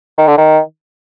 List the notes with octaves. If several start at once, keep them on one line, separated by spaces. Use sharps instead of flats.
D#3
D3
D#3